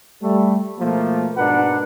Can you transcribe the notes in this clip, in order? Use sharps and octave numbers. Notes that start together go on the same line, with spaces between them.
G3 A3
B2 F3 A3 A#3
G#2 B2 D4 A#4 B4 F#5